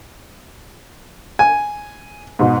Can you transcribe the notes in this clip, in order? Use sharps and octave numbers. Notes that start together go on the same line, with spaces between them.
G#5
G#2 B2